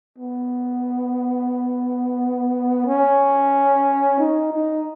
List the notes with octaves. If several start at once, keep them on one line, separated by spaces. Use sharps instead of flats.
B3
C#4
D#4
D#4